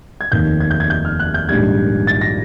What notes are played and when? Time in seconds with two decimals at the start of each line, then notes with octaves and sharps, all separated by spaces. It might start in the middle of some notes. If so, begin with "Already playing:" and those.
0.21 G#6
0.32 F1 D#2 D#3 G6
0.60 G#6
0.71 G6
0.80 G#6
0.90 G6
1.05 F6
1.19 F#6
1.34 G6
1.49 A#1 G#2 D#3 G3 G#6
2.07 A6
2.21 A#6